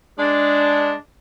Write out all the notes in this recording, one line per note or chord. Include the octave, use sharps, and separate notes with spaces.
G#3 D4